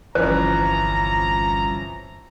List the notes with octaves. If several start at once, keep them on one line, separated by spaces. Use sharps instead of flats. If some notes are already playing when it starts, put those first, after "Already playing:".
G1 C2 E3 F3 C#4 C5 A#5